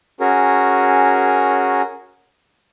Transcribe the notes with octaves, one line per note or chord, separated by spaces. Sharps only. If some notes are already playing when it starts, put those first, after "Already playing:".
C#4 F#4 G#4 A#4